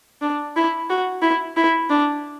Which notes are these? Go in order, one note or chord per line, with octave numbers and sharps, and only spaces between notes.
D4
E4
F#4
E4
E4
D4